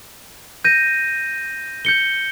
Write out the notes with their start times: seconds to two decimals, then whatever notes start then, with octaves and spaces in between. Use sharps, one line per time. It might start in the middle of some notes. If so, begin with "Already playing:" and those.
0.65 G6 A#6 D#7
1.85 G6 C#7 G7